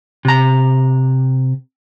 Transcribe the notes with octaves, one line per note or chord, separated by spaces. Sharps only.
C3 A#5